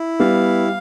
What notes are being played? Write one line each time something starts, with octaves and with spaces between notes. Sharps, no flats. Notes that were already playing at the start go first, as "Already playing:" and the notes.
Already playing: E4
G3 B3 F5